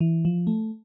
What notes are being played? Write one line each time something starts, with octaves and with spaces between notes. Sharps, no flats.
E3
F3
A3